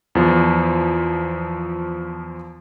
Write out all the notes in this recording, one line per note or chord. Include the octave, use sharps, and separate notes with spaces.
E2 F3